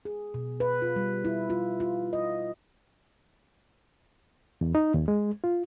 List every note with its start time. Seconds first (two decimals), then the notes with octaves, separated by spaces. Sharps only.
0.05 G#4
0.34 B2
0.60 B4
0.82 F4
0.96 G3
1.25 E4
1.50 F4
1.80 F4
2.13 D#5
4.61 E2
4.75 D#4
4.94 D#2
5.08 G#3
5.44 F4